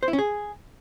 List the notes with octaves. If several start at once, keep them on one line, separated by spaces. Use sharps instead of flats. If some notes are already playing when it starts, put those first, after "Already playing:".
C5
E4
C#4
G#4